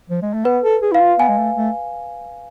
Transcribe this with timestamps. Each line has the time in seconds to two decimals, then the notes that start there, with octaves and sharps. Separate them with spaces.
0.10 F3
0.22 G#3
0.33 A3
0.45 B3 B4
0.64 A4
0.82 G#4
0.92 E4 F5
1.01 F4
1.19 B3 G#5
1.29 G#3
1.38 A3
1.56 A3